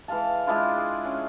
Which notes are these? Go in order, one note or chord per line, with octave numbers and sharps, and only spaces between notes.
E3 G#3 F5 A5
G#3 D4 E4 F4
G#4 D5
C#4